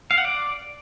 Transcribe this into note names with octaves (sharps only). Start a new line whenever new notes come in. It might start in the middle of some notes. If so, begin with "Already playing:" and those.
F5
F#5
D5